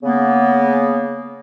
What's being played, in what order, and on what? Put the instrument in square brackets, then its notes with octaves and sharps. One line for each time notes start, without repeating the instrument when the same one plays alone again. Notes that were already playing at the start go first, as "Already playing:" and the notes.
[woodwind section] C#3 A#3 B3